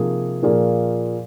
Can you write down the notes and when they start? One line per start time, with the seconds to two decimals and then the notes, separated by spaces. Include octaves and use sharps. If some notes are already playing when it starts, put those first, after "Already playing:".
Already playing: C3 F3 A#3 D#4 G#4
0.43 A#2 F3 A#3 F4 G#4